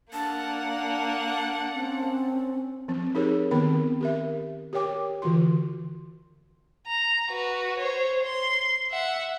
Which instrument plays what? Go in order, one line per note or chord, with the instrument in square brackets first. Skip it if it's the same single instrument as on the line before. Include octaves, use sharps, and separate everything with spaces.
[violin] A#3 F#5 [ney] D4 [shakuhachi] A5
[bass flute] C4 [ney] C#4
[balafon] F3 C4
D#4 G4 G#4 A#4 C#5
D#3 B3 C4 A#4 B5
G4 A#4 E5
G4 A#4 C#5 G5 D6
D3 E3 F4 F#4 C6
[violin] A#5
F#4 B4
C5 C#5
C6
E5 F#5